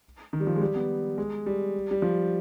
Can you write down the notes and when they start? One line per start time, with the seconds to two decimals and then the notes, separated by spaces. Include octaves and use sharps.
0.33 D#3
0.40 G3
0.47 F3
0.56 G#3
0.61 G3
0.75 B3
1.18 G#3
1.46 G3
1.91 G3
2.02 F3